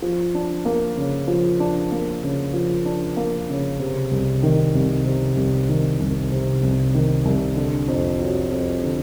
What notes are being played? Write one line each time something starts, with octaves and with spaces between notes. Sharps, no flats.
F3
D4
A#3
C#3
F3
D4
A#3
C#3
F3
D4
A#3
C#3
C3
C2
D#3
C2
C3
C2
D#3
C2
C3
C2
D#3
C2
D3
F2
F#3
F2
D3